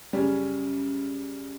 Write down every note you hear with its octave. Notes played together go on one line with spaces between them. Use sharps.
F#2 C#3 G3 C#4